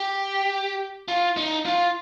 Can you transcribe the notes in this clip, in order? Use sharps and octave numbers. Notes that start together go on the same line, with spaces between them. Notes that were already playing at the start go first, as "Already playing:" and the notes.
Already playing: G4
F4
D#4
F4